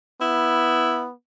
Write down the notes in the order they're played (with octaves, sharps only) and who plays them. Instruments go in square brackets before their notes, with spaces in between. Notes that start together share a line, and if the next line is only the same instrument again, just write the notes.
[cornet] B3 [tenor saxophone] E4